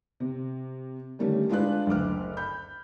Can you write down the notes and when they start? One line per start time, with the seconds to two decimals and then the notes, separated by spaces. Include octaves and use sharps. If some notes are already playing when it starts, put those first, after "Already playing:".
0.20 C3
1.19 D3 D#3 G3 A3 C#4
1.49 G#3 D4 F4 B4 F#6
1.87 F#1 D2 D6 F6
2.37 B5 G6